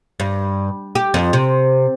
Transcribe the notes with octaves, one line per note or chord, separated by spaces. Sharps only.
G2
G4
F2
C3